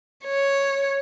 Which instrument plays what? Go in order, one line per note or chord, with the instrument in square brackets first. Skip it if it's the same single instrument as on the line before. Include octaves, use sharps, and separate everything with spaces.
[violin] C#5